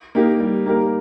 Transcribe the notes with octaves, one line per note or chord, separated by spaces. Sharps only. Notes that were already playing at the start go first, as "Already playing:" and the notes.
A#3 D#4 G4 A#4
G3
A#3 D#4 G4 A#4